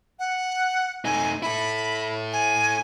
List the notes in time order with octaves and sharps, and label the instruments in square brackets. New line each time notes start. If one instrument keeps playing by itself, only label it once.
[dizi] F#5
[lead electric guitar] A3 D#4 [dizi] G#5
[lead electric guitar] E4 A4 [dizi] B5
[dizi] G#5